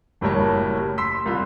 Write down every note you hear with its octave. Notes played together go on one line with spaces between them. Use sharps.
F#1 A2 G3 A#4 C#5 A5
C6 E6 B6
C2 F4